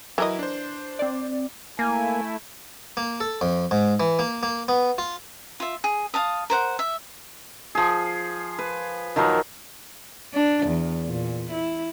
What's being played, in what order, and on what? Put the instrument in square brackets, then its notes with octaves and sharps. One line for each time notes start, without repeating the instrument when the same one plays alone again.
[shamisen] E3 A#4 D#5 [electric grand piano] F#3 E4
[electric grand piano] D4 C5
[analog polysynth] C4 D5
[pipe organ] A3 E4 [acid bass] A#3 [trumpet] G#5
[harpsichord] A#3
A4
F2
G#2
E3
A#3
A#3
B3
F4
[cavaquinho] F4 E5
G#4
F5 A5 D#6
A#4 C5 F#5
E5
[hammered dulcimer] F3 G#4
B4
D#3 F3 F#3 A#4
[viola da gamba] D4
E2
A#2
E4